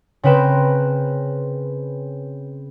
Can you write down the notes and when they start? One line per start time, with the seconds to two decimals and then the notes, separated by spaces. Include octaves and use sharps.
0.23 C#3 C4 A#4 B4 G5 E7